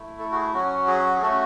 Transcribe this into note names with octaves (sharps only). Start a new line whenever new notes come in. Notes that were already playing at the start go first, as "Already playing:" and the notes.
Already playing: A3 E4
A4
F#4
G#4
F#3 C#4 F#4
G#4
G#4
A3 C#4 F#4 A4